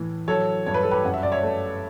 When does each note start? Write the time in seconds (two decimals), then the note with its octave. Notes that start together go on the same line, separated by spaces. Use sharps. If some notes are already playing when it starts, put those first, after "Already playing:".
Already playing: A2 E3
0.28 F#3 A4 C#5
0.66 G2 C#5
0.74 B4
0.83 A4
0.91 G4 B4
1.05 F#2 F#5
1.14 E5
1.23 D5
1.32 C#5 E5
1.43 A3